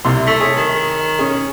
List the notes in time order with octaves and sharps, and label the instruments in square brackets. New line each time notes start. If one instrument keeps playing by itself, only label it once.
[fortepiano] C2 C3 C6
[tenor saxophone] A3
[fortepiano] G#4 C#5
[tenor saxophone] D#3
[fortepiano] C#4 G#4